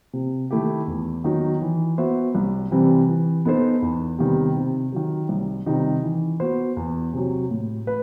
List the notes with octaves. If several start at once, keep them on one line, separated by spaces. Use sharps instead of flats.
C3
D#3 A3 E4 G4
E2
D#3 F#3 B3 D#4
E3
B3 F#4 C5 E5
C2
C3 E3 G3 C4
E3
B3 D#4 A4 C5
E2
C3 D#3 G3 B3
C3
D#3 F#3
C2
C3 D#3 G3 D#4
E3
B3 F#4 C5
E2
C3 F#3
A2
B4